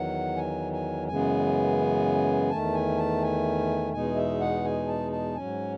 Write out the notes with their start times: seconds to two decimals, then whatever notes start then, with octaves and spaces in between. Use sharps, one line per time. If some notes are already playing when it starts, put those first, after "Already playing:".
Already playing: E2 D#3 F#3 F#5
0.37 G#5
0.73 G#5
1.08 F#2 C#3 E3 G#3 B3 G#5
2.50 E2 D#3 A3 A5
2.74 G#5
2.98 A5
3.22 G#5
3.93 E2 B2 G#3 D#4 G#5
4.16 E5
4.41 F#5
4.64 G#5
4.88 A5
5.12 A5
5.35 G#2 F#3 C#4 G#5